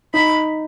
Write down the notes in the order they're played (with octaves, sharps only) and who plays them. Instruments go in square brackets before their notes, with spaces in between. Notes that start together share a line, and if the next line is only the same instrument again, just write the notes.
[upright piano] D#4 [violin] B5